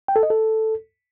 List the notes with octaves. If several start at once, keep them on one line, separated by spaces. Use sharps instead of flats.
G5
A4
D#5
A4